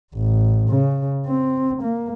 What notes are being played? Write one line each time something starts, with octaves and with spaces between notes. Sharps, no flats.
A1
C#3
C4
A#3